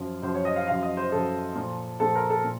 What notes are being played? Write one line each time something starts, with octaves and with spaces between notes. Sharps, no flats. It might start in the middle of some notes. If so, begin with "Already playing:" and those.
Already playing: F#2 F3
F#2 F3 C5
C#5
D#5
F5
F#2 F3 F5
D#5
C5
F#2 F3 A4
A#2 F3
A#2 F3 A4
A#4
A4
A#2